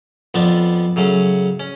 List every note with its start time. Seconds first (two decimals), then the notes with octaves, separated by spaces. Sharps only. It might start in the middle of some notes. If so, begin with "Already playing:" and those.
0.34 F2 F3 B3 D4 F4
0.96 C#3 F#3 A3 C#4
1.60 C#4